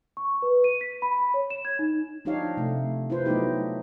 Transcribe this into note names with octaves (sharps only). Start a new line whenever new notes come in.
C#6
B4
D#7
B6
B5
B5
C#5
E7
G#6
D#4
F3 D4 D#4 G4 C#5 F5
C3 A3
E4 F4 B4 C5
F#3 A3 B3 D#4 G4